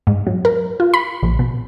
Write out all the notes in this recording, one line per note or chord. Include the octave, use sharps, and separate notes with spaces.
G#2
F#3
A#4
F4
B5
A#1
B2